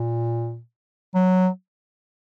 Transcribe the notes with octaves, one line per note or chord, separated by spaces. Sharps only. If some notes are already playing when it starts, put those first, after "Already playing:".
Already playing: A#2
F#3